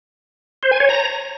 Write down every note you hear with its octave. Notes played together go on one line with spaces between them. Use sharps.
C5
G#5
C#5
A#5